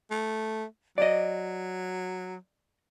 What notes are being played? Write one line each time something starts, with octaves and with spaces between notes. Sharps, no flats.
A3
F#3 D5 D#5